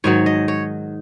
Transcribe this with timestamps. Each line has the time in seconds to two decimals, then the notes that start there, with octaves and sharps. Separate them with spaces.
0.04 G#2 D#3 F#3 C#5
0.26 D#5
0.48 C#5